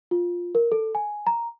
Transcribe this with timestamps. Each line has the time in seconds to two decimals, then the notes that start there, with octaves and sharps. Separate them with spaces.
0.11 F4
0.55 A#4
0.72 A4
0.95 G#5
1.27 A#5